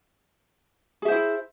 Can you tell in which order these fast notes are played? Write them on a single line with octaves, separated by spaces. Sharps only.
G#4 E5 C5 E4